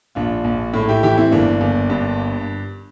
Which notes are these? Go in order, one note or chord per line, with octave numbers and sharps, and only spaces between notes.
A#1 D4 F4
A#1
A2
E4 G4
E3 E4 G4
C4 E4
G1 A#3 D4
G1
G2